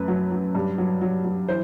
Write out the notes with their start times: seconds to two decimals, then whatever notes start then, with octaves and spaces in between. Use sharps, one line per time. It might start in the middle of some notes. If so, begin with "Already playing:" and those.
Already playing: F#2 A3 B4
0.08 F#3
0.32 F#3
0.55 G2
0.78 F#3
1.01 F#3
1.24 F#3
1.48 E3 C5